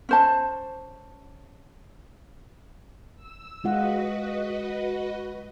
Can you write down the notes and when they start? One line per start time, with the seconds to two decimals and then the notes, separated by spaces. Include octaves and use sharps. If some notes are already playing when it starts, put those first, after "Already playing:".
0.09 C#4 C5 A5
3.16 E6
3.64 G#3 F4 F#4 B4 D#5 F#5